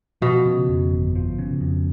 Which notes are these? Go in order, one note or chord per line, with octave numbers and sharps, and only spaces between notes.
B2 F3
C#3
F2
G1
F3
C#3
F2